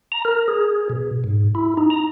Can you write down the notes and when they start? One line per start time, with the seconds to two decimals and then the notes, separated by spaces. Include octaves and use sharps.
0.12 A#5
0.25 A#4
0.48 G#4
0.90 B2
1.24 G#2
1.55 E4
1.77 D#4
1.90 A#5